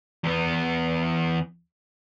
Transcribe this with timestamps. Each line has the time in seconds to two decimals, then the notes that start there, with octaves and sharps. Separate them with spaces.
0.24 E2 B3